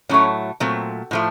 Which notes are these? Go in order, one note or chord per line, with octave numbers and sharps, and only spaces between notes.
A2 F#3 A3 C#4
A#2 F#3 A3 C4
A2 F3 A3